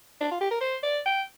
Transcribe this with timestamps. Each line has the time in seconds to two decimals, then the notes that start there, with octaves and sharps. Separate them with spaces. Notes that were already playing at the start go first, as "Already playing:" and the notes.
0.21 D4
0.31 F4
0.41 G4
0.51 A#4
0.61 C5
0.83 D5
1.06 G5